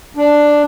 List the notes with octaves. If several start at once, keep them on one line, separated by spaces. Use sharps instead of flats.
D4